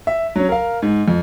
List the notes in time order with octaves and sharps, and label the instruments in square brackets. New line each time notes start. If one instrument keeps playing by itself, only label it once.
[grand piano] E5
F#3 C#4
A#4 F5
G#2
F2